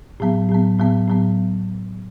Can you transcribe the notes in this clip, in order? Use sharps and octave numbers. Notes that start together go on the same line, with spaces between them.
A2 F#3 B3
A2 F#3 B3
A2 F#3 B3
A2 F#3 B3